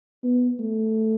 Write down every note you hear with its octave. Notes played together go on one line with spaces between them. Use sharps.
B3
A3